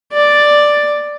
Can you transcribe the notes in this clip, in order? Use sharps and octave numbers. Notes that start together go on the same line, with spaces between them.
D5